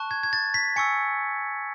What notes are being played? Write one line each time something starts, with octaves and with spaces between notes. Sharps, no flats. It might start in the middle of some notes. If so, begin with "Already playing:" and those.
Already playing: A5 C#6 F#6
G#6
G#6
A6
B6
G#5 C#6 E6 C#7